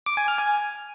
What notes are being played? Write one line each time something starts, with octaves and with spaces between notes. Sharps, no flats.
D6
G#5
F6
G#5